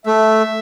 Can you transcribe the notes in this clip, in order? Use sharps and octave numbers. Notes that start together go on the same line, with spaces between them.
A3 E5